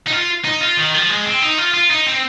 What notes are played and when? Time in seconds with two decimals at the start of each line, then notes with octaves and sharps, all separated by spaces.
0.07 D#4
0.13 F4
0.45 D#4
0.61 F4
0.77 D#3
0.94 F3
1.09 G#3
1.25 C4
1.42 D#4
1.58 F4
1.74 F4
1.91 D#4
2.07 C4